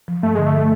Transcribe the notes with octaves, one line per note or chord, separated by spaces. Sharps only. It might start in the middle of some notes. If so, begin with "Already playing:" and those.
F3
G2 A3
D3 G#3
A3